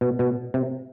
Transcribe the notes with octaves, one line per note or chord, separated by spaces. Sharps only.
B2
B2
C3